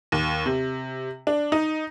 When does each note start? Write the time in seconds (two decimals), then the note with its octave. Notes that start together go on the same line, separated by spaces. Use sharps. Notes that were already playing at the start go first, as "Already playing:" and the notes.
0.12 D#2
0.46 C3
1.27 D4
1.52 D#4